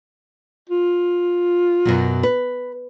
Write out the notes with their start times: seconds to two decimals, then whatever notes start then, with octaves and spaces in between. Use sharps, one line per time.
0.70 F4
1.85 F#2 B2 F#3
2.23 B4